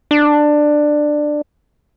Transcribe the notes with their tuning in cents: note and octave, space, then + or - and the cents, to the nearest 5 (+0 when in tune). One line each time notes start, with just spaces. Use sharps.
D4 +15